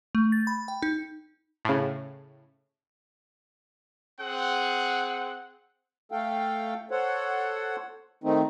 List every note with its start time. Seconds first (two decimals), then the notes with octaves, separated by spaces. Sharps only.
0.15 A3
0.32 A6
0.47 B5
0.68 G5
0.82 D#4
1.65 A2 C#3
4.21 C4 G#4 F#5
6.12 A3 A4 F5 G5
6.91 A4 C5 C#5 F#5
8.24 D#3 A3 C4 D#4